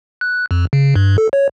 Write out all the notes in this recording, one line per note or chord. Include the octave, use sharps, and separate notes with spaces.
F#6
F2
C#3
G2
A4
C#5